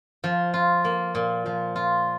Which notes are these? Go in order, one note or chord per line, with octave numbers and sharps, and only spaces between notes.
F3
F4
A#3
A#2
F3
F4